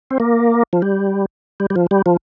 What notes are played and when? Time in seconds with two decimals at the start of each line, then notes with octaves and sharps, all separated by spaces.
0.11 C4
0.20 A#3
0.73 F3
0.82 G3
1.60 G3
1.70 G3
1.76 F3
1.91 G3
2.06 F3